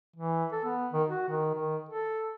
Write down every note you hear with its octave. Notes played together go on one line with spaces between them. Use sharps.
E3
A4
B3
D#3
F#4
D#3
D#3
A4